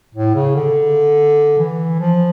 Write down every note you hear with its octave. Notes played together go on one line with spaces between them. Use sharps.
A2
C#3
D3
E3
F3